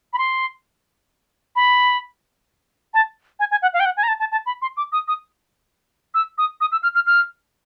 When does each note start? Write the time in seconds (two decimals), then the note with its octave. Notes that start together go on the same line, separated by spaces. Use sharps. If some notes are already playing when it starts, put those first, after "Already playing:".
0.13 B5
0.18 C6
1.56 B5
2.94 A5
3.39 G#5
3.51 G#5
3.62 F#5
3.74 F5
3.80 G5
3.85 F#5
3.97 G#5
4.03 A#5
4.08 A5
4.19 A5
4.32 A5
4.46 B5
4.62 C6
4.77 D6
4.92 D#6
5.08 D#6
6.14 E6
6.38 D#6
6.61 D#6
6.72 E6
6.83 F6
6.95 F6
7.07 F6